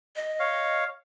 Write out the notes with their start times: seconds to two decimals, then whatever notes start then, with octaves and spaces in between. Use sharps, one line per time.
0.16 D#5
0.39 C#5 F5